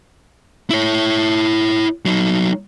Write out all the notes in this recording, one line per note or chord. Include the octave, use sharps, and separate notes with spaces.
E4 C#5
F#3 D#4